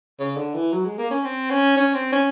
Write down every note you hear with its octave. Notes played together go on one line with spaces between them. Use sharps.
C#3
D3
E3
F#3
G#3
A#3
C#4
C4
C#4
C#4
C4
C#4